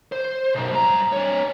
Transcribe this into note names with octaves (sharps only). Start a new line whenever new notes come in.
C5
B1 F#2
G2 A#5
D4 C#5